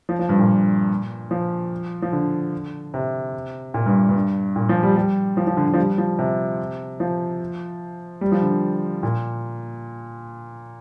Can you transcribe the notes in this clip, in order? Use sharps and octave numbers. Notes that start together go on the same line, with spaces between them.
F3
F3
G2
A#2
F3
F3
D3
C3
A#2
G2
G2
A#2
F3
G3
G3
F3
F3
D3
D3
F3
G3
F3
C3
F3
G3
F3
D3
A#2